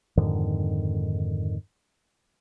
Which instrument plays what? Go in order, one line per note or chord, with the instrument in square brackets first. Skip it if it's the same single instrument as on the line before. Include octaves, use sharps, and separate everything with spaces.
[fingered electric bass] F2 G#2 D3 D#3